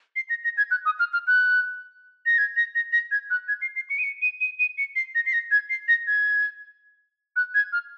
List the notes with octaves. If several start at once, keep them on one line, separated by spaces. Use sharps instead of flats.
C7
A#6
A#6
G#6
F#6
D#6
F6
F6
F#6
A#6
G#6
A#6
A#6
A#6
G#6
F#6
G#6
C7
C7
C#7
D#7
C#7
D#7
D#7
D#7
C#7
C7
A#6
C7
A#6
G#6
C7
A#6
G#6
F#6
G#6
F6